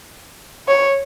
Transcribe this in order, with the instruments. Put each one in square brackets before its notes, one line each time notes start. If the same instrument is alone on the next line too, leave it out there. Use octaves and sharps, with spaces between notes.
[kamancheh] C#5